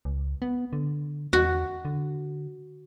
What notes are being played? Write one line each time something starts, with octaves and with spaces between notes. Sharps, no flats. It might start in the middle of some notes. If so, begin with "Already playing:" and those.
C#2
B3
D3
E2 F#4
D3